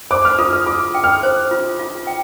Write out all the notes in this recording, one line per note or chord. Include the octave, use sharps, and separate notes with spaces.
C5 D6
F6
F4 D#6
F6
F4 D6
G5
F6
C5
F4
F4
G5